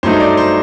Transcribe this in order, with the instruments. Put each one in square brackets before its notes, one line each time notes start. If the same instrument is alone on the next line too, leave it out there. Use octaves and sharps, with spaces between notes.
[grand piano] G2 F#3 A3 D#4 C5
D5
C5